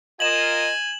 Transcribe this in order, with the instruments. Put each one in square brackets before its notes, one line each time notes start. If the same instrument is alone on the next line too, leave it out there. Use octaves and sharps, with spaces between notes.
[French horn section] F4 A#4 D#5 [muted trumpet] G#5 [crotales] E7 F#7